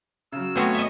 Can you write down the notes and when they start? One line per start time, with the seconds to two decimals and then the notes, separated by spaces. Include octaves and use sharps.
0.32 C#3 F#3 E6
0.56 A3 B3 C4 F#4 G#4 C#5 G#5
0.75 D#5 E5